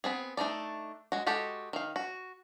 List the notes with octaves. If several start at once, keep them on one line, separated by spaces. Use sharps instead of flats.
B3 C4 G#4
A3 D4 D#4 D5
G#3 F#4
G#3 F#4 G4 A4
D#3 F5
F#4